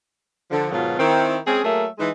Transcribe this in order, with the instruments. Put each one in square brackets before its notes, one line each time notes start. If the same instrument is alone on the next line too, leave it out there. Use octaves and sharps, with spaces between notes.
[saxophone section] D3 F3
G#2 B2 D#3 F#3 B3 F4
D#3 C4 E4
G#3 C4 C#4 G#4
F#3 A3 A#3 G#4 A#4 E5
E3 G#3 D#4